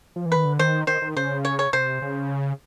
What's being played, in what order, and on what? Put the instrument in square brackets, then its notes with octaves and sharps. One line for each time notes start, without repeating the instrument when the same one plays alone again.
[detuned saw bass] F3
E3
[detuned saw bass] D#3 [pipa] B4
[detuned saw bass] D3
[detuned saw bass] D#3 [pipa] C5
[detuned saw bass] D#3 [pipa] C5
[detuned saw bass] D#3
[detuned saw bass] C#3 [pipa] C5
[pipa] C#5
C#5
[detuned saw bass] C3 [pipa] C5
[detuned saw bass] C#3